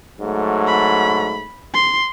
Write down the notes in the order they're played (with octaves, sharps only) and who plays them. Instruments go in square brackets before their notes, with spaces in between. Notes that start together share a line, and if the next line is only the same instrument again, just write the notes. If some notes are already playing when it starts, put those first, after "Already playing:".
[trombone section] G#2 F#3 A3
[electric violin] B5
C6